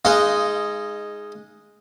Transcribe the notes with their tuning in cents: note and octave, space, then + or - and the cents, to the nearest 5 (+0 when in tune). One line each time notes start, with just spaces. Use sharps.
G#3 +0 D#4 -5 F5 -35